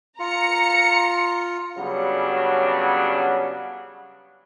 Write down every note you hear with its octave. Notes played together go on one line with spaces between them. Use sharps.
F4 A#5 C#7
C#3 F#3 G3 B3 C#4 D4